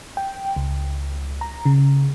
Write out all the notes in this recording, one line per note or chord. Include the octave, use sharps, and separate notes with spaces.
G5
C#2
A#5
C#3